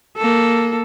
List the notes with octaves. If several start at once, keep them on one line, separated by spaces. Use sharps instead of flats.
A#3 A4